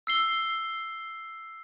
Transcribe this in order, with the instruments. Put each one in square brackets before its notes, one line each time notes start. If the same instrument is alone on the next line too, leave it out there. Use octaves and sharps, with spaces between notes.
[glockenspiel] E6 C7 G7